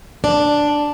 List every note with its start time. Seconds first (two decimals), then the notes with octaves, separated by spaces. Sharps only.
0.24 D4